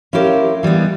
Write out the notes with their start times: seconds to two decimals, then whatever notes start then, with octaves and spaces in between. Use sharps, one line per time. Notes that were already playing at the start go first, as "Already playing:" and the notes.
0.13 C#4 E4 F4 G4 A4 A#4
0.63 E3 G3 G#3 B3